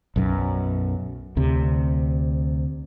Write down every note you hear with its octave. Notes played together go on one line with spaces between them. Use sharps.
B1 F#2
D2 C3